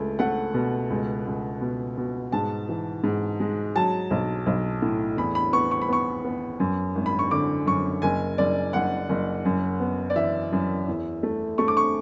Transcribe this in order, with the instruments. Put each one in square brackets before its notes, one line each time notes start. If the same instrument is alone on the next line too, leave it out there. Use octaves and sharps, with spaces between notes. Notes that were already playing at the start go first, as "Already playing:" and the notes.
Already playing: [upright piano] C#2 A3
A3 F#5
B2
C#2
C#2
B2
B2
G#2 A5
E3
G#2
G#3
F#3 A5
B1
B1
A2
E2 B5
B5
B3 C#6
C#6
B5
B3 C#6
B3
F#2
G#1
B5
C#6
D3 D6
F#2 C#6
F#1 G#5
F#1 D5
F#1 F#5
F#1
F#2
B3
D5
E3 E5
F#2
E2
A3
A3 C#6
D6
C#6